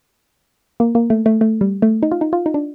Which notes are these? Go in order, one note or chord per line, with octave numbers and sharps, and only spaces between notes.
A#3
A#3
A3
A3
A3
G3
A3
D#4
F4
D#4
F4
D#4
D4